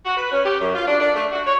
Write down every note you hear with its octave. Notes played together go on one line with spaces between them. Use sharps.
F#4
B4
C#4
G4
F#2
F4
D4
D4
A3
F#4
C#5